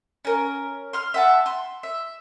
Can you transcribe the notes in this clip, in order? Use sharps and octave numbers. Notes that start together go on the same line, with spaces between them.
C#4 A#4
C6 F6
E5 F#5 A5
C6
E5